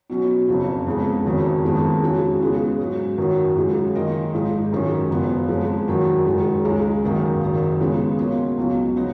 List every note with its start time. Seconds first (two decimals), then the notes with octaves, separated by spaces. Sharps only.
0.10 B2 F#3 C#4
0.48 F#1 F2 C#3
0.86 F2 C#3 G#3 B3
1.25 F#1 F2 D#3 F#3
1.64 F2 D#3 G#3 B3
2.02 C#3 G#3 C#4 F#4
2.41 C#3 G#3 B3
2.79 G#2 F#3 C#4
3.18 F#2 D#3 F#3
3.56 F#2 C#3 G#3
3.95 D#3 A#3 F4 A#4 D#5
4.34 G#1 G#2 F3 G#3 D#4
4.72 F#2 D#3 G#3 C#4
5.10 F#1 F#2 F3 B3 F4
5.48 F2 F3 G#3 C#4
5.88 F#2 D#3 F#3
6.26 F#1 F#2 D#3 G#3
6.65 C#2 C#3 G#3 C#4
7.03 G#1 F#2 D#3 A#3
7.41 F#1 F#2 D#3
7.80 C#3 G#3 B3 F4
8.18 B2 A#3 C#4 F4
8.57 C#2 B2 F#3
8.96 C#3 F3 B3 D#4